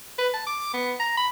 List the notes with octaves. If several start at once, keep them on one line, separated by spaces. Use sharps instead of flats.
B4
A5
D6
B3
A#5
B5